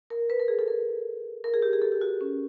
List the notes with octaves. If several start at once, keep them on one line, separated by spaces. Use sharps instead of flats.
A#4
B4
A#4
G#4
A4
A#4
A#4
G#4
G4
G#4
A4
G4
F#4
C#4